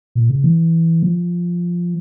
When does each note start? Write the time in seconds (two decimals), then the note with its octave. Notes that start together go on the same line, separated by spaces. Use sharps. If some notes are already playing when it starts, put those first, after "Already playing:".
0.15 A#2
0.30 C#3
0.44 E3
1.03 F3